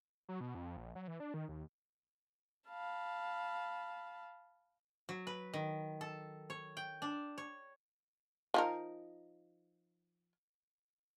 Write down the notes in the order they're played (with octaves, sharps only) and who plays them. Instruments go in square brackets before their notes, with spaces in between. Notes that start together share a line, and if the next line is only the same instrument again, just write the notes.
[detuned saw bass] F#3
B2
F2
A#1
F#3
E3
D4
D#3
D#2
[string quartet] F5 A5 B5
[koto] F#3
B4
D#3
A4
C#5
G5
D4
C#5
[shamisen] F3 D#4 A#4